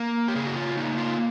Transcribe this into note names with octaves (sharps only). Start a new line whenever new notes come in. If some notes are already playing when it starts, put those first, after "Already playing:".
Already playing: A#3
G4
C#3 G#4
F#4
F4
A#3 D#4
F4